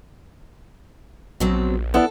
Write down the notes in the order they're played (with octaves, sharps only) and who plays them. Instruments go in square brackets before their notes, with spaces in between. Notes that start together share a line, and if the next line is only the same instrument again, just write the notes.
[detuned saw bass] A#1 [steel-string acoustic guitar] B2 F#3 C4
[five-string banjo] B3 E4 D5 [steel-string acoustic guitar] A4